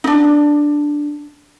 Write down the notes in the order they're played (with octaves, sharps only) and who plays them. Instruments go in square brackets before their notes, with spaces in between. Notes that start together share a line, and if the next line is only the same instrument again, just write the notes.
[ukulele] D4 D#4